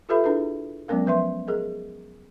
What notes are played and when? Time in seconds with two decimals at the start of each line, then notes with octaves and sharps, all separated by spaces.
0.09 F4 G4 A4 B4 E5 B5
0.24 D4 E4 G#4 B4
0.88 F#3 G#3 B3 C#4 A#4 F5
1.06 F3 B4 E5 C6
1.47 G#4 A#4 D#5